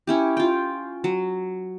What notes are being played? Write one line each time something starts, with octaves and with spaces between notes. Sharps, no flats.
C#4 E4 G4
F4 G5
F#3